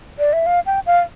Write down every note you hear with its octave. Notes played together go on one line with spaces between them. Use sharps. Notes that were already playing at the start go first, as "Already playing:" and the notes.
D5
E5
F5
G5
F5